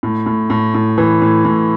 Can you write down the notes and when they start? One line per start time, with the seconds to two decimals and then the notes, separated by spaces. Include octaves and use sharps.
0.03 A2
0.26 A2
0.50 A2
0.74 A2
0.98 E3
1.22 A2
1.45 A2